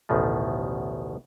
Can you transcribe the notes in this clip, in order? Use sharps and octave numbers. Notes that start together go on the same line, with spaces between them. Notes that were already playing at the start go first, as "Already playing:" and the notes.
A1 D2 B2 D#3 F3